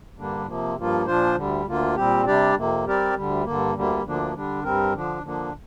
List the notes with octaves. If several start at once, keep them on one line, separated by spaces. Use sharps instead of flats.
G2 D3 G3 A#3 D4
C3 F3 A#3
G2 F3 A#3 F4
A#2 F3 D4 F4 C5
D2 D3 G3
D2 D3 A#3 F4
A#2 G3 C4 G4
C3 G3 D4 G4 D5
F2 C3 A#3
G3 C4 G4 A#4 D5
D2 D3 G3
G2 D3 A#3
D2 D3 G3 A#3
D2 D3 F3 A#3 D4
D3 G3 D4
G2 G3 C4 A#4
D3 F3 D4
D3 F3 A#3 D4